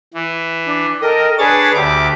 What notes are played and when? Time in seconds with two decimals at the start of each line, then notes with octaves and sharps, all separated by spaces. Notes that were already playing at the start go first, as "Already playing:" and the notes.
0.14 E3
0.66 D4
1.02 A4 A#4 D#5 G5
1.38 D4 G#4 B4 C#5 A6
1.74 D2 G4 E5 A5 D6